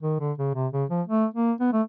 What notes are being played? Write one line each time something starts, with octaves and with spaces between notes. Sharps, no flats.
D#3
D3
C#3
C3
C#3
F3
A3
A#3
B3
A3